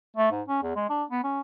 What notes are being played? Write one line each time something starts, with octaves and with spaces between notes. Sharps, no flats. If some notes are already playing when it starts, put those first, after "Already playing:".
A3
G#2
C#4
E2
G#3
D4
B3
C#4